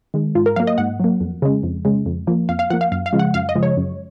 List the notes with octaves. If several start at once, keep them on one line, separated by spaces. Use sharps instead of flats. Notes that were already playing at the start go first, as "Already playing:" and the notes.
D#3 G#3
G#2 F4
A#4
F#3 A#3 F5
D#5
G#2 F#5
F#3 A#3
F2
C#3 G#3
F2
C#3 G#3
F2
F3 A#3
F2 F5
F5
F3 A#3 F#5
F5
F#2 F5
F5
C#3 F3 G#3
F#5
F#2 F5
D#5
C#3 F3 G#3
C#5
F#2